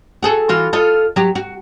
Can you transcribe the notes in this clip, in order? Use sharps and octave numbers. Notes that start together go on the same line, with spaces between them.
F#4 G#4 A4
E3 F4 F#4
F4 A4 D#5
F#3 G4
F#4